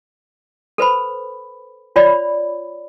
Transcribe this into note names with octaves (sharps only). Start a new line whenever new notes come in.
A4 B4 C5 B5
F4 C#5 D5 B5